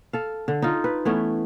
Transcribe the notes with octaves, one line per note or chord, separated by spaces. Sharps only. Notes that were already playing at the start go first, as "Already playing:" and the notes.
A4 F5
D3
D#4 F4
B4
E3 A3 B3 C#4